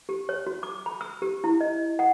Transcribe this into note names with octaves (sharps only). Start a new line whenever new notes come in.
G4
C#5
F#4
D6
B5
E6
G4
E4
D#5
F#5